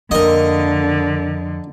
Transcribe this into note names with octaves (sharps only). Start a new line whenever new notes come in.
F2 D3 A#3 C4 A#4 D#5